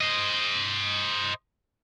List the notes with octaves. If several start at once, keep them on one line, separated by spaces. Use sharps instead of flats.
C5 D#5